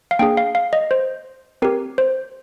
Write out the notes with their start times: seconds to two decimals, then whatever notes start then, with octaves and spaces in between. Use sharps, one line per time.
0.11 F5
0.19 A#3 D4 G#4 G5
0.37 F5
0.55 F5
0.73 D#5
0.91 C5
1.62 C4 G4 A#4
1.98 C5